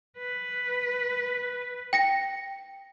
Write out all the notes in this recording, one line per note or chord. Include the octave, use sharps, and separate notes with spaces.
B4
G5 A#6 C#7